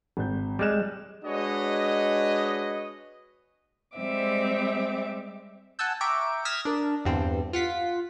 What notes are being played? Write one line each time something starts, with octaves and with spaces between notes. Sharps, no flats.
G#1 G6
G3 G#3 F6 F#6 E7
G#3 D4 F#4 B4 C#5 D#5
G3 G#3 C4 E5 D6
F#5 G#5 A5 E6 G6
E5 G5 A#5 C#6 D6 D7
D#6 F6 G#6 A#6 B6 E7
D4 A#4
E2 G2 D3 G3 C4
F4 F#5 B6